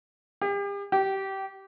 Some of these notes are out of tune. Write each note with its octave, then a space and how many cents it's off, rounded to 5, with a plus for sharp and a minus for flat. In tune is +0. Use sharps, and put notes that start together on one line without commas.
G4 +40
G4 -20